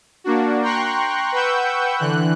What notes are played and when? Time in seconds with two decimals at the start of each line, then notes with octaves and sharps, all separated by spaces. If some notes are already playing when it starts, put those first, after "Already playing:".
0.24 A#3 D4 F#4
0.62 G5 A#5 C6 C#6 F#6
1.32 B4 F#5 G5 C#6 E6 G6
1.99 D3 E3 F#6